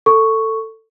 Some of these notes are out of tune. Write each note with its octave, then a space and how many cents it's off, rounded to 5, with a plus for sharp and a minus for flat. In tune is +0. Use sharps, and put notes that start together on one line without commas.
A4 +15 C#6 +0